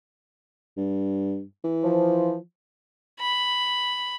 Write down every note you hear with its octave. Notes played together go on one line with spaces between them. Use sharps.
G2
E3
F3
B5